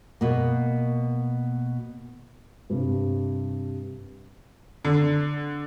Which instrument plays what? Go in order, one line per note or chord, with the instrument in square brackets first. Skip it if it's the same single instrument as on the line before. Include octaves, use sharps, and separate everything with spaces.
[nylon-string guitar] B2 A#3
[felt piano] G2 C3
[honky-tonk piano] D3